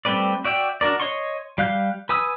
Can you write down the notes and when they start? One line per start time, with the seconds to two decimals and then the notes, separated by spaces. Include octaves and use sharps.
0.05 G3 A3 C4 B4 D5
0.45 F#4 D5 E5 G5
0.81 D4 F#4 A#4 D5
1.00 C#5 D#5 C6 C#6
1.58 G3 F5 F#6 G6
2.09 B4 G#5 D#6 E6